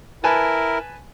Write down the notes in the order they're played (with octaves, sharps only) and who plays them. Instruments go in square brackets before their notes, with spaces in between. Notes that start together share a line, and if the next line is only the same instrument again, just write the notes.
[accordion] E4 A#4 [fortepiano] B4 G#5 A5